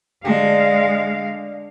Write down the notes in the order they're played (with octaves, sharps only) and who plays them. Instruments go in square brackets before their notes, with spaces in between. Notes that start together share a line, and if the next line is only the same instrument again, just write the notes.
[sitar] D3 [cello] G#3 F5